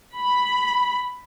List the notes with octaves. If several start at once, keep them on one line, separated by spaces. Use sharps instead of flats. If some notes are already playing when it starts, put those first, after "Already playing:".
B5